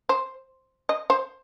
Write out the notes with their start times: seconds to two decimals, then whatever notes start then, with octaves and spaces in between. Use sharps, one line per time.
0.09 C5
0.89 D#5
1.10 C5